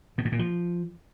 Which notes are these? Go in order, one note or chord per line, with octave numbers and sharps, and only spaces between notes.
B2
A2
A#2
F3